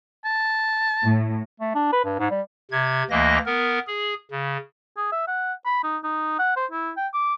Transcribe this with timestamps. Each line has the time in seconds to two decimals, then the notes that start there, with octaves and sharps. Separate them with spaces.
0.25 A5
1.03 A2
1.60 A3
1.75 D4
1.92 B4
2.05 G2
2.19 G#2
2.30 G3
2.71 C3 G#6
3.10 D2 E3 A#3 D#5 A#6
3.46 B3 A#4
3.87 G#4
4.31 C#3
4.97 G#4
5.12 E5
5.28 F#5
5.65 B5
5.83 D#4
6.04 D#4
6.39 F#5
6.56 C5
6.71 E4
6.97 G5
7.14 D6